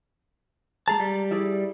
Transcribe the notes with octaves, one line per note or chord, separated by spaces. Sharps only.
G#3 G#4 A5 A#5
G3
E4 G#4 D5